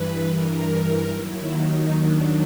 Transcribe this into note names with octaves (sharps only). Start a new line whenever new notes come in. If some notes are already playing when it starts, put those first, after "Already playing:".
Already playing: G2 E3 B4
A#4
D#2 D#3 F#3 E4
D#4
D4